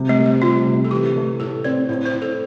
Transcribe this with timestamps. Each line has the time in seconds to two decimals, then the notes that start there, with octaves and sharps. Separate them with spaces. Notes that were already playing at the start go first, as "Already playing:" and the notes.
Already playing: C3 G3
0.09 A3
0.17 C3
0.26 A3
0.41 G3 F4
0.66 C3
0.85 A4
0.91 E3 G4
1.16 A3
1.40 A2 A4
1.64 C4 D5
1.89 A2 C5
2.05 C5
2.14 A2
2.22 A4